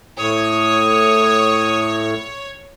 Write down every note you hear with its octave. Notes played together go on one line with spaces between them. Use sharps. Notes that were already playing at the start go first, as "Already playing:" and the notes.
A2 C#5 D#6